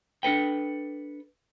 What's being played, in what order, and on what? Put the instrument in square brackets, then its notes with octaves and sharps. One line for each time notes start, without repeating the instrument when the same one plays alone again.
[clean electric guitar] D4 A4 B4 G5